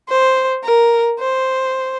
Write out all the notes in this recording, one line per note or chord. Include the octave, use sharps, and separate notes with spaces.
C5
A#4
C5